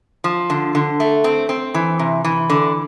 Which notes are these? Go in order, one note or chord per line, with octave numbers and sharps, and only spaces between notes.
F3
D3
D3
A3
C4
C4
E3
C3
E3
D3